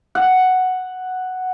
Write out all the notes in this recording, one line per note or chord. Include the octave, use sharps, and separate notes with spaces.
F#5